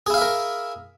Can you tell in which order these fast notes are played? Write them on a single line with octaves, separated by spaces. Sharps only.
G#4 E4 F5 E5 A#4